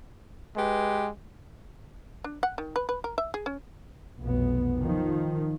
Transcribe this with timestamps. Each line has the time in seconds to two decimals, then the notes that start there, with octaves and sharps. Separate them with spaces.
0.56 G#3 G4 B4
2.24 D4
2.43 F#5
2.58 D#3
2.76 B4
2.89 B4
3.04 A#4
3.18 E5
3.34 G#4
3.46 C#4
4.19 F1 B1 B3
4.82 D#3 F3